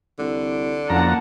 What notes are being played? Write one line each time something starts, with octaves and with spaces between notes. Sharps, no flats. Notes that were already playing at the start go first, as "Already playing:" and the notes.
C2 D3
F#1 F2 A#3 F#5 A5 A#5